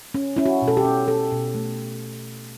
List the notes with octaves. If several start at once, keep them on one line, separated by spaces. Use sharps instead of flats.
C#4
C#4 E4
F#4
B2
A4
G4
C#4
B2 A4
B2
A3